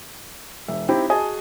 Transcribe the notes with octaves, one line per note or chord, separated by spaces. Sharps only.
E1 E5
C4 D#4 E4 G4
F#4 G#4 D#5 G#5 A5